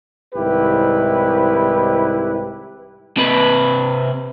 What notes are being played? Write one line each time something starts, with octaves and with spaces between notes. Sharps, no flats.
C2 G#2 D#3 E4 G4 B4
C3 B4